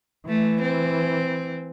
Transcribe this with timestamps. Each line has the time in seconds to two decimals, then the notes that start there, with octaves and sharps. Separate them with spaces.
0.27 E3 A3
0.61 C4